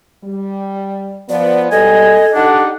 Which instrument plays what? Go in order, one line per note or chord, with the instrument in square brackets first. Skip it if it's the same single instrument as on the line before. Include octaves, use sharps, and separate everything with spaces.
[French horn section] G3
[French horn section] F3 B3 [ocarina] D5
[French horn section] G#2 B2 G3 [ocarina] A4 [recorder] D#5 [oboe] G#5
[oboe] D4 [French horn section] D#4 G4 [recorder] F#5